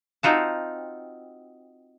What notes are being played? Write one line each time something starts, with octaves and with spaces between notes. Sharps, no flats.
C4 D#4 F4 F#4 A5